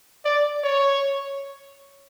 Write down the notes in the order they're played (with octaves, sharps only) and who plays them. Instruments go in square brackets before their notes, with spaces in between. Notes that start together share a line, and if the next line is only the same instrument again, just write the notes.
[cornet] D5
C#5